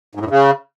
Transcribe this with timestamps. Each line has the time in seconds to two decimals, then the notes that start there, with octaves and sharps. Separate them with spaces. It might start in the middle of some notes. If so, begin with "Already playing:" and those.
0.15 G#2
0.20 A2
0.25 G2
0.30 C#3